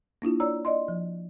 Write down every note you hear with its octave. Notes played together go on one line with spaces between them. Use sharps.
A#3 D4 E4 F4
C#5 D5 A#5 E6
D5 D#5 C6
F3